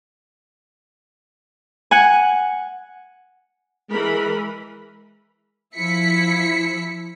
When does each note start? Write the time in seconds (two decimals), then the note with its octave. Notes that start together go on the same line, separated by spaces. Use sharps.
1.91 F#5 G#5
3.90 E3 G#3 A#4 B5
5.77 F3 E4 B6 C#7